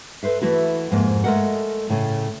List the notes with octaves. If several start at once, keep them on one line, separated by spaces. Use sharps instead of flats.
A4 B4 C5 E5
E3 A3 E4 F#4
F2 G#2 A#3
G#3 A3 A4 A#4 D#5 F#5
A2 C#3 A3